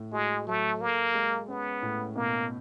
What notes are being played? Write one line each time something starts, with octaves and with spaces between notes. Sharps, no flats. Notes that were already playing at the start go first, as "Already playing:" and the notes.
Already playing: A2
G#3 F#4
F#3 A3
A#3 A4
G#3
B3 C#4
A2
B2 A#3